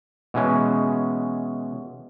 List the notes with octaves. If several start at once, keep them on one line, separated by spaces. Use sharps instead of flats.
B2 E3 G#3 C#4